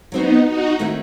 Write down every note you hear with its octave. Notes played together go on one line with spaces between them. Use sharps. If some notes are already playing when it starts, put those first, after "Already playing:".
F#3 B3 C4 D#4 F#4 C5
D#4 F#4
D#3 A3 C4 E4